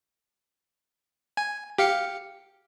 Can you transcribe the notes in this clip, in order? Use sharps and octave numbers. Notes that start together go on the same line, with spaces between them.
G#5
G4 F5 C#7